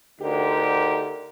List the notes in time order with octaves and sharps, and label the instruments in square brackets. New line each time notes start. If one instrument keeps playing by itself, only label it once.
[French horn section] D2 D3 D#4 G4 A#4